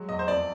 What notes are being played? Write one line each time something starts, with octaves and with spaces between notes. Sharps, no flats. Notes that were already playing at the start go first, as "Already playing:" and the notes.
Already playing: F#3 G#3
E2 D#5
C5
F2 D5